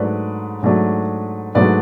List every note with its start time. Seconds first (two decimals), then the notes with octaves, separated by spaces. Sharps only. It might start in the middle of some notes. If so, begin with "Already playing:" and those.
Already playing: G#2 F#3 A3 D4 B4 D5
0.63 G#2 F#3 A3 D4
1.55 G#2 F#3 A3 D4 B4 D5